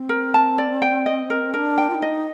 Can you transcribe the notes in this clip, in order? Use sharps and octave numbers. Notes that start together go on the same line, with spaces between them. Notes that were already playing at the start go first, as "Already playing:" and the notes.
Already playing: C4
A#4
A5
D5
G5
D#5
A#4
D4 A#4
G5
F4
D#4
D#5